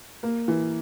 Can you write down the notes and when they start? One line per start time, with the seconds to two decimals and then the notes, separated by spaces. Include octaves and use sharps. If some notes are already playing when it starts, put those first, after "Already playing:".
0.23 A#3
0.48 E3